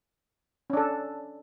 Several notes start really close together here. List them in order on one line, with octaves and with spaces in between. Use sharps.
C#4 D4 A4